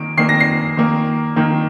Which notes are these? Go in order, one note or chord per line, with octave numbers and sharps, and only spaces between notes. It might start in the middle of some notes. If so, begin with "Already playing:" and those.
Already playing: D#3 A#3 D7
D#3 A#3 C7
A#6
C7
D#3 A#3
D#3 A#3